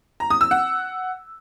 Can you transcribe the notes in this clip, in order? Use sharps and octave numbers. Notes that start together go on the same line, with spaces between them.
A#5
D#6
E6
F#5